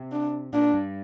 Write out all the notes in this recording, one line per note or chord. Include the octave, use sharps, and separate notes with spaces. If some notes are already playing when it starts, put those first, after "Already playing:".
Already playing: C3
D4
A#2 D4
G2